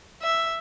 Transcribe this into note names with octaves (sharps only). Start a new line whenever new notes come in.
E5